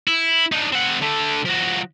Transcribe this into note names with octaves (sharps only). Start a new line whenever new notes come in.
E4
D4 D#4
C4 F#5
D3 A3
F3 F#4